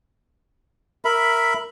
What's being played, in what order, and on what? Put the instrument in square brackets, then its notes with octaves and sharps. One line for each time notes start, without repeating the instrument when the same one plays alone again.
[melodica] A#4 E5 B5